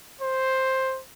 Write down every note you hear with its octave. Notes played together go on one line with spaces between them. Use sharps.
C5